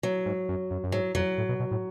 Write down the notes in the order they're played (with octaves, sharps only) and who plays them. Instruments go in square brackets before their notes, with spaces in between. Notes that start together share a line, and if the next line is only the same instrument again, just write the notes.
[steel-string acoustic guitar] F#3
[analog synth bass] G#2
F#2
F#2
F#2
[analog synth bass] G#2 [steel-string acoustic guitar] F#3
[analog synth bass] F2 [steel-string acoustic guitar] F#3
[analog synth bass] A2
B2
B2
A2